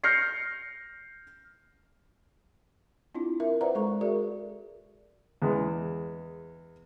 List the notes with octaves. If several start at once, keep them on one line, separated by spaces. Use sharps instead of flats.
F6 G6 A#6 C7 C#7
C4 D4 E4 F4
A#4 E5
B4 C5 D5 E5 F#5 A#5
G#3 A4 C#6
F#4 G#4 A#4 D5 E5
E2 G#3